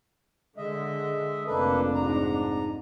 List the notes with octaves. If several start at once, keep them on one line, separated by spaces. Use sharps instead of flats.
D3 G#3 D#5 E5
F1 A#3 D4 A4 B4
G#2 A#5